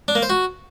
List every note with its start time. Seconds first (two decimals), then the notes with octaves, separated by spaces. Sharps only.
0.08 D4
0.15 A#3
0.22 C5
0.30 F#4